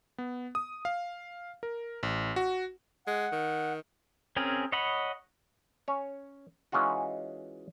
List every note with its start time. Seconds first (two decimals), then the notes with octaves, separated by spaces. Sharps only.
0.18 B3
0.55 D#6
0.85 F5
1.63 A#4
2.03 A1
2.36 F#4
3.07 G#3 F#5
3.32 D#3
4.36 C4 C#4 G#4 A#4
4.72 C#5 D#5 F#5 B5
5.88 C#4 C#5
6.72 E3 G#3 C#4 D#4 F4 F#4